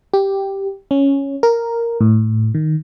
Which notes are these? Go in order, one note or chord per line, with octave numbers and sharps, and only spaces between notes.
G4
C#4
A#4
A2
D#3